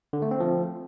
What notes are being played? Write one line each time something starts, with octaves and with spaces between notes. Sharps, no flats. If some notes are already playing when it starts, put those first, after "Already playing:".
D3
A3
C4
F3